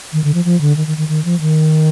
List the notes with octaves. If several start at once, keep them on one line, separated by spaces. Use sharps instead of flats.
D#3
D3
F3
F3
D3
D#3
D#3
D#3
D#3
F3
D#3